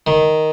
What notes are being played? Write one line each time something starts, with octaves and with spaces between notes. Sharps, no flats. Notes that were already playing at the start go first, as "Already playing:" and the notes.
D#3